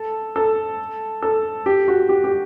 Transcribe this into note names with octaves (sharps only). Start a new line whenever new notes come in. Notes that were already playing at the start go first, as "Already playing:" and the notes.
Already playing: A4
A4
A4
G4
F#4
G4
G4